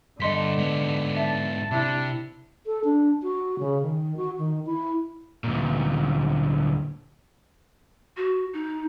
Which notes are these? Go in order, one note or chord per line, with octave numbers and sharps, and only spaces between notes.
G2 D3 A4 D#5 C6 B6
G#2 B3
E5 A5
C3 D4 E4
A4
D4
F#4
C#3
D#3
F#4
D#3
E4
D2 A#2
F#4
D#4